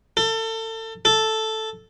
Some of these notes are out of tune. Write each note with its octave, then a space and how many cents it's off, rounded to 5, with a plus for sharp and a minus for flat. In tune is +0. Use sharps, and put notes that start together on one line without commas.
A4 +30
A4 +0